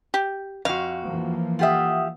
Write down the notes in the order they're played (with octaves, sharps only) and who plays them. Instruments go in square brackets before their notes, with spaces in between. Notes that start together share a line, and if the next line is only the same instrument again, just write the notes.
[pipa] G4
[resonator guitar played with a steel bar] F2 F#4 [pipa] F5
[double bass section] E3 F3 A#3
[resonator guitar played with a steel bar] F4 G4 E5 [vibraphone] F#5 D#6